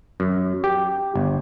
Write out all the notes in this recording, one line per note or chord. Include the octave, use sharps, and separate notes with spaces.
F#2
G4
G1